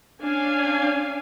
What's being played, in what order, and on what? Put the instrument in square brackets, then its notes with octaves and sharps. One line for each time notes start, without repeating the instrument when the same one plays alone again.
[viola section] C#4 D4 F5 G#5